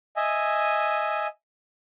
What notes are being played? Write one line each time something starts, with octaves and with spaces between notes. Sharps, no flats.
D#5 E5 G#5